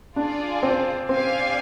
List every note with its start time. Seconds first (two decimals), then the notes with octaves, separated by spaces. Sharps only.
0.16 D4 F4 G#4 D5
0.63 C4
1.09 C4 G4 D5 F5 G#5